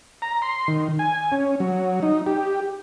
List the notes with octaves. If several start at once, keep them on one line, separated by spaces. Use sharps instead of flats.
A#5
C6
D#3
G#5
C#4
F#3
D#4
G4